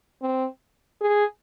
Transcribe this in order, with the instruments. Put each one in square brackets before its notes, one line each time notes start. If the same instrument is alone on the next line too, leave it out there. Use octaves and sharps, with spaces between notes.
[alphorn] C4
G#4